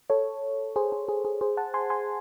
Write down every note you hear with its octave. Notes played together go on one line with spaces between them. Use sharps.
A4 C#5
G#4 C5
G#4
G#4
G#4
G#4 C5
F#5 A5
G#5 C6
G#5 C6